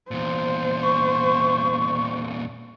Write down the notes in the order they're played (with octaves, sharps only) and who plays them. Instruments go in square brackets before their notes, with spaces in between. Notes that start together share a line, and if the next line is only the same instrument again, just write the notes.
[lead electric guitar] E2 A#2 [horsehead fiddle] C5
[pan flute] C#6